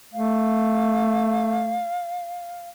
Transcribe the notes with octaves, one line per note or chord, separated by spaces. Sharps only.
A3 F5